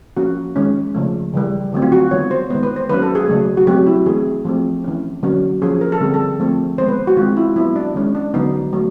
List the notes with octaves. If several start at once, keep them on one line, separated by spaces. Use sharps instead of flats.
F3 A#3 C#4 F#4
D#3 G#3 C#4
C#3 F3 A3
C#3 E3 G3
D3 F#3 A3 C4
F4
F#4
D#3 G3 B3 C#5
C5
D#3 G#3 B3 C5
B4
C5
D#3 F#3 A#3 C#4 B4
A4
G#4
C#3 F#3 A3
F#4
F#3 A3 C4 G4
E4
E3 A3 C4 G#4
F3 A3 C4
E3 A3 C#4
D3 F#3 A#3 C#4
F3 A#3 C#4 G#4
A#4
A4
D3 G3 C4 G#4
A4
F3 A3 C4
D#3 G#3 B3 C5
B4
F#4
D#3 G#3 C4 F4
E4
F#3 B3 E4
D4
D#3 G#3 C#4
D4
D3 F#3 B3 D#4
F#3 A3